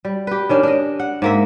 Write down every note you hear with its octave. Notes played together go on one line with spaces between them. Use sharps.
G3
G4 B4
D#3 C#4 D4
D4 D#5
F#5
G#2 A#3 E5